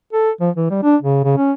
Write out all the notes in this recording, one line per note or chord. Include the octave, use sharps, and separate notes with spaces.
A4
F3
E3
G3
D4
C#3
C#3
C#4